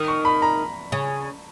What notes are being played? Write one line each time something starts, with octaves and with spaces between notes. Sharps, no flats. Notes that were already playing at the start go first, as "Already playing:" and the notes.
Already playing: D#3
C#6
B5
A#5
C#3